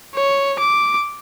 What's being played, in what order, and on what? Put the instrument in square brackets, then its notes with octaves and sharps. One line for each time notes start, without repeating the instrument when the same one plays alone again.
[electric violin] C#5
D6